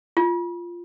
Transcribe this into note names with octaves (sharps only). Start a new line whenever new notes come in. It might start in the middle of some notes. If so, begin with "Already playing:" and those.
F4